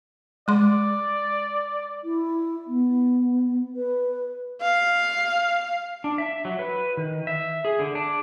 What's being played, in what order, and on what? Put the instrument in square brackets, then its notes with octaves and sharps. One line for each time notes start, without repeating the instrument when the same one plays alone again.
[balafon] G#3 C6 [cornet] D5
[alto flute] E4
B3
B4
[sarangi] F5
[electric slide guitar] D4
E5
F#3
B4
D#3
E5
G#4
D3
D4